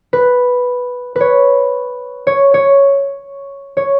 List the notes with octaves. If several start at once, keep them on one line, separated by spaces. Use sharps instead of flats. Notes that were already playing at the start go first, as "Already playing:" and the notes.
B4
B4 C#5
C#5
C#5
C#5